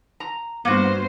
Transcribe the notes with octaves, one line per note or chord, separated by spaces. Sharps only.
A#5
G2 A#3 B3 F#4 C5